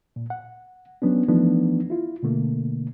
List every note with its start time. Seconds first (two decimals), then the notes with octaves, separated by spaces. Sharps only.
0.16 A#2
0.30 F#5
1.02 F#3 B3 C#4 D4
1.28 E3 F3 A3 B3 D4 D#4
1.90 E4 F4
2.23 B2 D3 A3 A#3